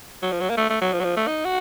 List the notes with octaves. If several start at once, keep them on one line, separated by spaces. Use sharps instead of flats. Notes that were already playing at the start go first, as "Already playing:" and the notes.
F#3
F3
F#3
A#3
A3
A3
F#3
F3
F#3
F3
A3
D#4
F#4